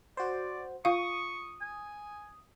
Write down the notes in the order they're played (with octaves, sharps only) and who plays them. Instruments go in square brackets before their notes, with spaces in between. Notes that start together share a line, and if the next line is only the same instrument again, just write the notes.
[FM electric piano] F#4 C5 [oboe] D5
[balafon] F4 F5 [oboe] C#6 [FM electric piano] D#6
[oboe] G#5